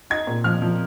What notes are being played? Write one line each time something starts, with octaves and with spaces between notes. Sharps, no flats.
D#4 G#6
A#2
F3 F6
F3